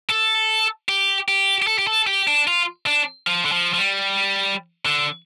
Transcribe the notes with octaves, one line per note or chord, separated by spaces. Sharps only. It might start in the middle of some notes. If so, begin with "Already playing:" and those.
A4
G4
G4
G4
A4
G4
A4
G4
D4
F4
D4
F3
D3
F3
F3
G3
D3